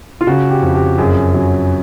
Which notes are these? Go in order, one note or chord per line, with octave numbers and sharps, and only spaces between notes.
F4
C#3 F#4
G4
F2
G4
F#2 G#4
F#3